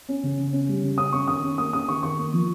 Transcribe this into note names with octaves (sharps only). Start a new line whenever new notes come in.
C#4
C#3
C#3
C#4
G3
C#3
C#4 D#6
C#4 C#6
D#3 D#6
C#4
A#3 D#6
C#4 D#6
D#3 C#6
D#3 C#6
A#3
F3